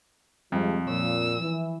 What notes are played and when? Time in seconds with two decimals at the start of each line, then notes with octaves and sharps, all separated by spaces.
0.52 F2 C3 F3 G3 G#3
0.87 A#2 F3 E6
1.40 E3